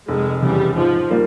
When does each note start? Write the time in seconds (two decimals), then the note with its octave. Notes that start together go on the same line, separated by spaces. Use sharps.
0.08 F1 G#3
0.42 E2 C#3 G3
0.76 G#2 F3
1.11 G3 A#3